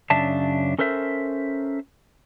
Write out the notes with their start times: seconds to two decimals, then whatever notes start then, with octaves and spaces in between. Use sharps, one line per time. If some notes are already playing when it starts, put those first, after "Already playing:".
0.10 F#2 C#3 D4 E5 A5
0.78 C#4 A4 A#4 C5 E5